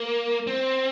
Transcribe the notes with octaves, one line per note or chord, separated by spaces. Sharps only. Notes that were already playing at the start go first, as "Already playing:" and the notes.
Already playing: A#3
C4